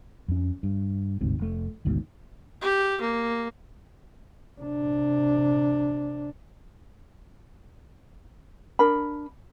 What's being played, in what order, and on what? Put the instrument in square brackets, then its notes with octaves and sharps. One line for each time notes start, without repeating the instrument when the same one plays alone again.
[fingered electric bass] F2 C#4
G2
G1 D2 G#2 C3
F1 A3
G#1 D2 G#2 B2
[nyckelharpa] G4
A#3
[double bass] C3 D4
[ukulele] D4 A#4 B5